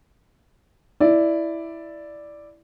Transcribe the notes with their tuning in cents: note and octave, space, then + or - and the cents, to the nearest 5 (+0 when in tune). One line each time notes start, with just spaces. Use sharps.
E4 +0 D5 +0